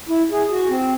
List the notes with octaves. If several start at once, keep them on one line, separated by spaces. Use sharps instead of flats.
E4
G#4
F#4
C4